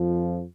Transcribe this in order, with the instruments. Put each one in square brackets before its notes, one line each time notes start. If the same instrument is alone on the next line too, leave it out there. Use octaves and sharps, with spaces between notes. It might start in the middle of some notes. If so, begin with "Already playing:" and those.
Already playing: [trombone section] F2 F3